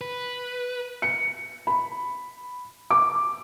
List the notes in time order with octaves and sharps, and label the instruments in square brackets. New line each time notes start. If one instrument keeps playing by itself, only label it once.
[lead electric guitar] B4
[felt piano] C#7
B5
D6